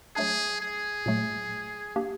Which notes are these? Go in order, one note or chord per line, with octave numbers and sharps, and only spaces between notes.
F#3 A3 D4 G#4
G#4
A#2 F#3 A3
A#3 D4 G4